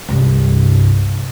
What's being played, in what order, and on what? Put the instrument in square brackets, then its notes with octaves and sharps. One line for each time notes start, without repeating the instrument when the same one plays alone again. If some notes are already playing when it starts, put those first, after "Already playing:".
[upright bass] C2 G2